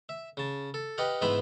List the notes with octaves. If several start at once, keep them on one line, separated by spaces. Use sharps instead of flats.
E5
C#3 A5
A4
G4 B4 D#5 F5 F#5
G#2 E3 B3 C5 E5 B5